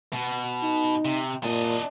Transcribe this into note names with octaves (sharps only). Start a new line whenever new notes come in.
B2
D#4
C3
A#2 D4 D#5